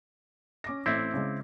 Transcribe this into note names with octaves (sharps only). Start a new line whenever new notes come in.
C#4 D6 A#6
A1 A3 C4 E4 E5
C#3 G#3